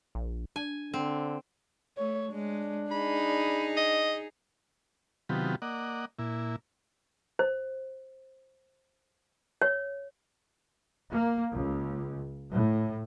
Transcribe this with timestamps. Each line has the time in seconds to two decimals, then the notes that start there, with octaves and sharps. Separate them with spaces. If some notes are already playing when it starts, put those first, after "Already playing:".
0.15 A#1
0.56 D4 G#5
0.94 D3 C4
1.98 A3 C#5
2.32 G#3 D4
2.91 D#4 G#4 B5
3.77 D#5
5.29 C3 D#3 F#3 B3 F4 G4
5.62 A#3 D5 D#5 F#5
6.19 A#2 E4
7.39 C5
9.61 C#5
11.12 A#3
11.54 C#2
12.50 A2